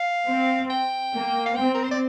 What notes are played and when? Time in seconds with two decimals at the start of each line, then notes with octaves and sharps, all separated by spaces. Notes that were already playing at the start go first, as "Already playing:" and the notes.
Already playing: F5
0.27 C4
0.70 G5
1.13 A#3
1.46 F5
1.56 C4 G5
1.74 A#4
1.84 C5
1.91 D5